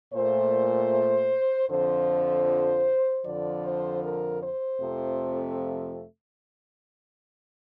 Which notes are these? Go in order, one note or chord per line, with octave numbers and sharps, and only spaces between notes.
A#2 A3 C5
F2 D3 F3 C5
F2 D3 F3 D5
C5
A#4
C5
F2 C3 F3 A3